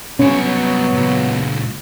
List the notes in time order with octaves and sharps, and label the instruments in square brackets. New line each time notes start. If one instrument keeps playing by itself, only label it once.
[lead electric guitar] C2 C#5 [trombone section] F#3 B3 [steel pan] C#4
[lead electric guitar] C#2 A#2